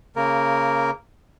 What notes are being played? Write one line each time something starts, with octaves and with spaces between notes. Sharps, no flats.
C#3 A#3 A#4